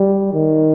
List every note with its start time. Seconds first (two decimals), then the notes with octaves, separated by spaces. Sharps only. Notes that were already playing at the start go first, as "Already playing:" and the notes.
Already playing: G3
0.33 D#3